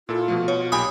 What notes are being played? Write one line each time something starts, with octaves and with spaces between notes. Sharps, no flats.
A#2 E4 F4 A4
B2 F3 A3
B2 C#5
B1 A#2 G4 G#5 B5 D#6